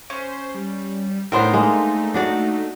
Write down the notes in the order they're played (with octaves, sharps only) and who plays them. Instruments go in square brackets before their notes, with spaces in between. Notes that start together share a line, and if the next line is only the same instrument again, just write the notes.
[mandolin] C#4 [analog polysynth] C5
[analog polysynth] G3
[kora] A2 B3 D4 [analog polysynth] A3 D#4 [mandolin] A#4 C5
[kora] G#3 A#3
D4 F#4 D5